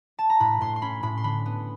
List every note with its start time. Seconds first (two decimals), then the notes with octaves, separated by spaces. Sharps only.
0.19 A5
0.30 A#5
0.40 A2 B5
0.61 A2 C6
0.76 C6
0.82 C#4 B5
1.03 A2 B5
1.17 C6
1.24 D3 B5
1.46 B3